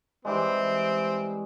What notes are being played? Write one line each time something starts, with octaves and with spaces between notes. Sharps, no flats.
E3 G3 G#3 C4